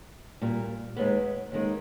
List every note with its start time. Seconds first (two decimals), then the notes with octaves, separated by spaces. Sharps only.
0.42 A#2 G3
0.96 D#2 D#3 G#3 B3
1.52 D#2 D#3 G#3